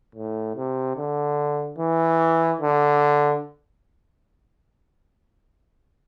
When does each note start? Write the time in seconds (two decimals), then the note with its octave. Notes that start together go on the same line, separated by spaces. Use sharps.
0.15 A2
0.56 C3
0.96 D3
1.78 E3
2.61 D3